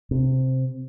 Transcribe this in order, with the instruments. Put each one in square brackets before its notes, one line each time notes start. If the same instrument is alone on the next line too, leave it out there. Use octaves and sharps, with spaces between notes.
[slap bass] C3